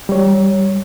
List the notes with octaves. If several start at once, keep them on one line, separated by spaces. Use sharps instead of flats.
G3 C#5